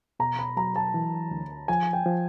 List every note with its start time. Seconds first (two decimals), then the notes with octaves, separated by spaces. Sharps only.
0.20 B2 A#5
0.39 B5
0.57 F#3 A#5
0.76 A5
0.94 E3
1.31 D2
1.68 F3 G#5
1.93 G5
2.06 F3